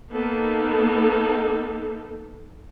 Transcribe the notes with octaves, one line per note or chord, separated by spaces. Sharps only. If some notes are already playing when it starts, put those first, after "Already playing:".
A#3 B3 D#4 A4